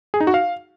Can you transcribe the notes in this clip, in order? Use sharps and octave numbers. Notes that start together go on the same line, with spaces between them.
G#4
D#4
F#4
F5